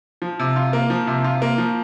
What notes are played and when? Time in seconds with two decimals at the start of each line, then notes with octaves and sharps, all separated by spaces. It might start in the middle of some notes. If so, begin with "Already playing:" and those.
0.22 F3
0.39 C3
0.56 F4
0.73 A#3
0.90 F3
1.07 C3
1.24 F4
1.42 A#3
1.58 F3